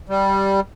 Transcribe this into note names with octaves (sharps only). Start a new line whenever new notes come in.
G3